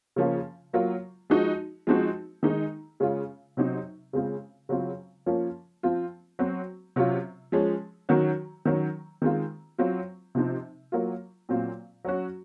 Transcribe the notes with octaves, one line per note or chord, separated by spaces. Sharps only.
C#3 F3 A#3 C#4 F4
F#3 A#3 F4
F3 G#3 D#4 F#4
F3 G#3 C4 D#4 F#4
D#3 G#3 D#4
C#3 G#3 C#4 F4
C3 F#3 C4 D#4
C#3 G#3 C4 F4
C#3 F#3 C4 F4
F3 A#3 C#4 F4
F3 C4 F4
F#3 C4 F#4
C3 F#3 C#4 F4
F3 G#3 C#4
D#3 F#3 C#4 F#4
D#3 F#3 C#4
D#3 G#3 C4 F4
F#3 C4 F4
C3 F3 C4 D#4
F#3 A#3 F4
A#2 F#3 C4 F4
F#3 C#4 F#4